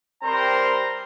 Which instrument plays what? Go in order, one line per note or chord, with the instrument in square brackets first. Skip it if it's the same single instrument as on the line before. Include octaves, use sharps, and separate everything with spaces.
[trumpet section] G3 C4 A#4 C5 A#5 C6